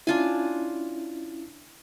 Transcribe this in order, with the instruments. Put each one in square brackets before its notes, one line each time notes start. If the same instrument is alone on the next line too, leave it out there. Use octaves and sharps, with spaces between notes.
[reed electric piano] C#4 E4 [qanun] D4 F4 G#5